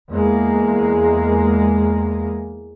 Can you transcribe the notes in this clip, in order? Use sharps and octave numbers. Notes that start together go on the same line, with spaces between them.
E2 G#3 A#3